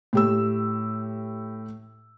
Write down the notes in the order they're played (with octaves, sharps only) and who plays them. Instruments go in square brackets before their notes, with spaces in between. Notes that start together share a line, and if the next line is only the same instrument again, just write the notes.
[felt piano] A2 G4 E6